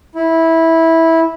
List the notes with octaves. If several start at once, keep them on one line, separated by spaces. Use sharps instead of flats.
E4